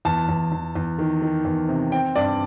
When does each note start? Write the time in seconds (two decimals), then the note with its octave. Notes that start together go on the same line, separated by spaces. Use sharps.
0.05 E2 A5
0.29 E2
0.52 E2
0.75 E2
0.99 D#3
1.22 D#3
1.45 E2
1.69 C3
1.92 C4 G5
2.16 G2 D5